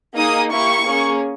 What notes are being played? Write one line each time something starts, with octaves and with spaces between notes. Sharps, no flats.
A#3 D#4 G#4 D#6
A#3 E4 G4 C#6
A#3 C#4 G#4